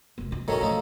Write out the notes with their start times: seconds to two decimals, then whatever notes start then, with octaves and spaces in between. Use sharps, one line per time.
0.18 F1 B3
0.31 C#4 D#4
0.48 B1 D#3 F#3 C#4 A4 C#5 D#5
0.61 A2 F3 D#4